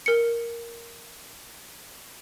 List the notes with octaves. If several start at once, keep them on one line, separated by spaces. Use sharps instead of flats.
A#4 C#7